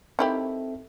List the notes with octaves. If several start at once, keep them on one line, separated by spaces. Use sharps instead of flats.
D#3 C4 E4 G4 A4 E5